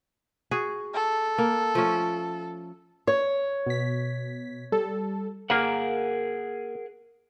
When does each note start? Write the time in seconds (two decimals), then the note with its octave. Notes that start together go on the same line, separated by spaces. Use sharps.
0.51 F#4 G#4
0.94 A4
1.38 A#3
1.75 F3 A3 C#4
3.07 C#5
3.66 B2 B6
4.72 G3 A4
5.50 A#3 G#4 A#4 F#5